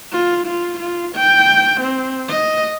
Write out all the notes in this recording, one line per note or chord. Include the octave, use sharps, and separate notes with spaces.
F4
F4
F4
G5
C4
D#5